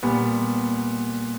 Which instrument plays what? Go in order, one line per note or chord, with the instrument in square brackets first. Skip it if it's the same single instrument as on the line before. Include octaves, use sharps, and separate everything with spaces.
[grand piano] A#2 G3 B3